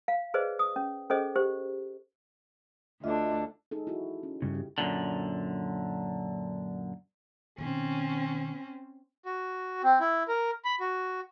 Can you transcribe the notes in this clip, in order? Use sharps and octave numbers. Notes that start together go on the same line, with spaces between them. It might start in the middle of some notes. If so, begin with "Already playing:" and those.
F5
G#4 B4 C5 D5 D#5
D#6
C#4
C#4 G#4 A4 C5 D#5
G4 C5
D2 D3 D4 F4 D#5 E5
D#4 G#4 A4
E4 F#4
C#4
G2 C#3
G4
F#2 A#2 D3
B2 D#3 C4 C#4
F#4
C4
E4
A#4
B5
F#4